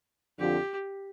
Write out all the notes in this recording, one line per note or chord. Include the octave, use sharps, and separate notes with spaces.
F2 D3 F3 C4 F4 G4